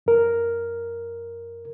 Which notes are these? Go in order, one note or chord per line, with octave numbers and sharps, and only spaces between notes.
F#2 A#4